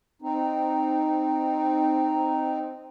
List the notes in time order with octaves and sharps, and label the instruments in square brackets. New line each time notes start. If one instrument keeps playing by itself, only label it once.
[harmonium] C4 D#4